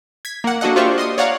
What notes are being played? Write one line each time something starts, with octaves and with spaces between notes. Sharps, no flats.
G#6 B6
A#3 F#5
A#3 D4 F#4 A4 D#5 F#5
F4 G4 C5 D5 E5 C#6
D#5 C6 D#6
C#5 D5 F5 F#5 A#5